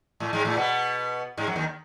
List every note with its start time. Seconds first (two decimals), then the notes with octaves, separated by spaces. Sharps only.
0.20 A2 A3
0.33 G#2 G#3
0.45 A2 A3
0.57 B2 B3
1.37 G#2 G#3
1.47 F#2 F#3
1.56 D#2 D#3